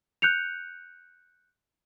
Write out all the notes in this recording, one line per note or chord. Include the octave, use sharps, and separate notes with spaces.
F#6 G6 C#7 F7